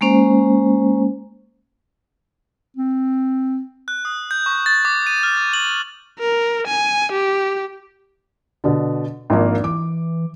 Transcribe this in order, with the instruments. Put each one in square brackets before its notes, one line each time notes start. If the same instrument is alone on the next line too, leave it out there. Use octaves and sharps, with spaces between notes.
[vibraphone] G#3 A#3 C#4 C5
[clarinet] C4
[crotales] F#6
D#6
G6
C#6
A6
D6
D#7
F6
G6
F#7
[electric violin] A#4
G#5
G4
[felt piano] B2 D3
[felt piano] G#1 F3 A#3 [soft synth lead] D4
[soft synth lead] E3 [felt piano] D6